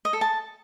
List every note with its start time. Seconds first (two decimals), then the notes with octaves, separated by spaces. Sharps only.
0.05 D#5
0.13 A4
0.21 A5